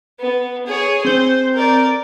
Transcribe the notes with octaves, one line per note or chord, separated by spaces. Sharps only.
B3
G#4 C#5
C4 C5 G6
A#4 D5